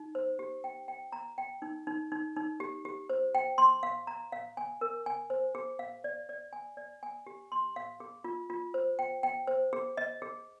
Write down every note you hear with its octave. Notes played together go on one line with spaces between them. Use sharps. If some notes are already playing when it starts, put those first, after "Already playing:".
Already playing: D#4
C5
G4
G5
G5
A#5
G5
D#4
D#4
D#4
D#4
G4
G4
C5
G5
C6
F5
A#5
F5
G#5
A#4
G#5
C5
G#4
F5
D5
D5
G#5
D5
G#5
G4
C6
F5
G#4
F4
F4
C5
G5
G5
C5
G#4
D#5
G#4